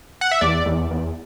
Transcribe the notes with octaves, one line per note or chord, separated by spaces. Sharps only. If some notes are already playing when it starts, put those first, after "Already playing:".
F#5
E5
E2 D5
E2
E2